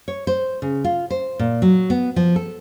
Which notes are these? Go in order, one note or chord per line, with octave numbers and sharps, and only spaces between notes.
C#5
C5
C#3
F4
C5
A#2
F#3
B3
F3
A4